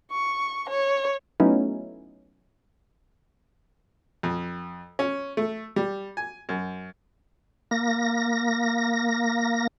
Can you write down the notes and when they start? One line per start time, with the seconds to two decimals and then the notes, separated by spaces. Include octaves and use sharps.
0.11 C#6
0.69 C#5
1.40 F#3 A3 B3 C#4 D#4 E4
4.23 F2
4.99 C#4
5.37 A3
5.76 G3
6.17 G#5
6.49 F#2
7.71 A#3 A#6